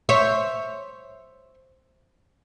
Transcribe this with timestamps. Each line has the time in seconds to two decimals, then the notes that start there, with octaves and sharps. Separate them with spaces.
0.09 C5 C#5 E5